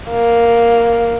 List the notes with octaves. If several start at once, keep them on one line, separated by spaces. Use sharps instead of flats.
A#3